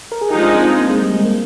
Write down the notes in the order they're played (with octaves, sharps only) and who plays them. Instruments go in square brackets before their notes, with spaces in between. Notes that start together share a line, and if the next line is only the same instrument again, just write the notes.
[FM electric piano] A#4
G#4
[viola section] F3 G#3 D#4 [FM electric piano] G4
[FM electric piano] D4
C4
C4
A#3
G#3
G3
G#3
A#3